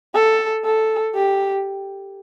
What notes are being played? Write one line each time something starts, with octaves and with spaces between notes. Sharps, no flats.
A4
A4
G4